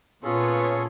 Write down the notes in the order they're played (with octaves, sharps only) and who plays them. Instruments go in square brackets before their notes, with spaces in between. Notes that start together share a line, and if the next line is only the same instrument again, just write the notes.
[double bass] A#2 [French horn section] B3 [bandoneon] C#4 G#4 A4 [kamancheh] F4 C#5